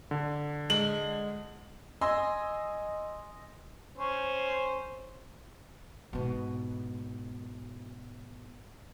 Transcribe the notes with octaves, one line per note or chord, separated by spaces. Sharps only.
D3
G#3 F#7
D#5 G#5 C6 E6
C#4 C5
G#2 B2